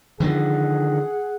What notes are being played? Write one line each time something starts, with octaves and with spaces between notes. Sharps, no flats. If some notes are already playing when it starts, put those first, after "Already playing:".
D3 D#3 F3 G#4 F#5